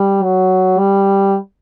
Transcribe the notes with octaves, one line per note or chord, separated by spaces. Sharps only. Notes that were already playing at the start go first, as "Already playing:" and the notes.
Already playing: G3
F#3
G3